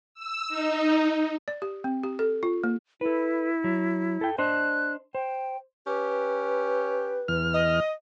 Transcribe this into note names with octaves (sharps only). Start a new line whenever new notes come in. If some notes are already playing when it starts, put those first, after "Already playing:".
E6
D#4
D5
G4
C4
G4
A4
F4
A#3
E4 A4 B4
F#3
A4 G5
D4 C5 D#5 F#6
C5 G5
C#4 G4 B4
E2 F6
D#5